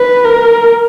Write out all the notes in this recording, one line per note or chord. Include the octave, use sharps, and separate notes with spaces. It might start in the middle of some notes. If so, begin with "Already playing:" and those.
Already playing: B4
A#4